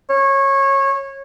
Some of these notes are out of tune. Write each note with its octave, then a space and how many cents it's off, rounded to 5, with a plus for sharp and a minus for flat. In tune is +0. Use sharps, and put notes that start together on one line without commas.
C#5 -20